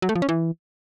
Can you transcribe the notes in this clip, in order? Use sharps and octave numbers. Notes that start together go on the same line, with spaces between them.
F#3
A3
F3
C#4
E3